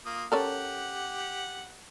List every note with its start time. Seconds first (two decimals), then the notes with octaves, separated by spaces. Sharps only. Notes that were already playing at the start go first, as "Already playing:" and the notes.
0.06 A#3 F4 D#6
0.32 C#4 G4 A4 A#4 F#5